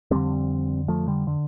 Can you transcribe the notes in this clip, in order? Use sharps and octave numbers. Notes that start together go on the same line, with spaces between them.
G1 F2 D3 G3 C4
F3 A3
D3 G3
D3